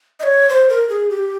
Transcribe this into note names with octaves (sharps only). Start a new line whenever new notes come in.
D#5
C#5
C5
A#4
G#4
G4